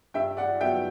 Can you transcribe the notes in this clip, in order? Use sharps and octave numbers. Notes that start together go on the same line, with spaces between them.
G2 E5 G5
D5 F#5
F#3 B3 E5 G5